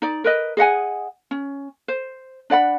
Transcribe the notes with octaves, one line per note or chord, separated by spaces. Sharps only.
D#4 D5
A#4 B4 D#5
G#4 D#5 F#5 G#5
C#4
C5
D4 D5 F#5 B5